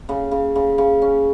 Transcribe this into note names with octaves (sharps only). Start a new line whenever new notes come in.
C#3
C#3
C#3
C#3
C#4